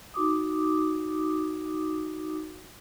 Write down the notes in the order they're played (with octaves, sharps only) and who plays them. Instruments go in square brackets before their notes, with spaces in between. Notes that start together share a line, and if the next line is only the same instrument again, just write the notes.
[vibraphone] D#4 F#4 D6 D#6